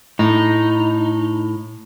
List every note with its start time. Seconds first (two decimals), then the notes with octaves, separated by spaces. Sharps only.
0.19 A2 D#4